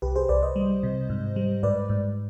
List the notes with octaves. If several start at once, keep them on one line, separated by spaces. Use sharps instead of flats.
C2 G4 B4
G#4 C5
C2 B4 D5
C5 D#5
G3
C3
G#2
G3
G#2 B4 D5
G#2